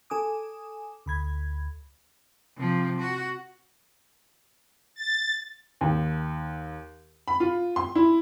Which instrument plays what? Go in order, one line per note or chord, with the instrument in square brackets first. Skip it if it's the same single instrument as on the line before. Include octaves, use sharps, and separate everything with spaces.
[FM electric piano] A4 G#5 D6 D#6
D2 B5 G#6
[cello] C3 F3
F#4
[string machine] A6
[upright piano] D#2
B5
F4
C6
E4